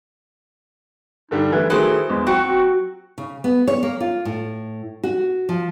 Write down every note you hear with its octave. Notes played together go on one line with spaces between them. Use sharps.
G2 D3 G3 D#4
E3 A3 B4
D#3 E3 F#3 A3 G#4 C5
E2 G#3
F#3 C4 F#4 C#6
C#3
B3
C#5
A#3
F4
A2
F#4
F3